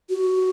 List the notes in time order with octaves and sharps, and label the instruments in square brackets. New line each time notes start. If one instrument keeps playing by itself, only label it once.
[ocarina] F#4